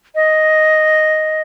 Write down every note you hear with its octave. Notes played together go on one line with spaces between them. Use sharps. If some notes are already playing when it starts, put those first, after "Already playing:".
D#5